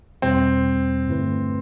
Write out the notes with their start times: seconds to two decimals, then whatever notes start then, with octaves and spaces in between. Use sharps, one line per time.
0.22 E2 B2 G3 C4
1.07 G2 D3 A3 E4 B4